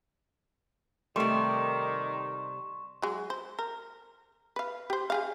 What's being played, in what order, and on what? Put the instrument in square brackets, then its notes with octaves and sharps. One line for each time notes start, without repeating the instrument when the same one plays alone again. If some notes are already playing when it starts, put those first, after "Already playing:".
[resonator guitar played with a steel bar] C3 G3 [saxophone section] D#3 [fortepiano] A3 [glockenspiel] C6 C#6 E7
[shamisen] F#3 G#3
C5
A#4
B4 F5
G4 C5
G4 G#4 F5